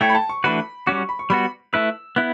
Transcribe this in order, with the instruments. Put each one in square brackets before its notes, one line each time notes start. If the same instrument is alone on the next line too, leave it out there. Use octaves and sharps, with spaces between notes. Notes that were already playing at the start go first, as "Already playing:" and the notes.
[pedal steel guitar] A3 E4 A4 C#5 [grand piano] G5
[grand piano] B5
A5
C#6
[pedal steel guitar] E3 A3 D4 F#4 B4 [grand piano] B5
[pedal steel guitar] G3 C#4 F#4 [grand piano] D6
[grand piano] C#6
B5
C#6
[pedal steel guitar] G3 B3 F#4 [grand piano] B5
[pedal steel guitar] A3 E4 B4 [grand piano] E6
[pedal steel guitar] B3 E4 [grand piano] F#6